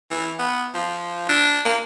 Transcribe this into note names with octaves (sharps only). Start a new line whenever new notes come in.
E3
B3
F3
D4
A#3